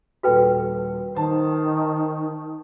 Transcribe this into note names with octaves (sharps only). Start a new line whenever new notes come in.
D#1 F#4 A4 B4 G5
D#3 C5 A5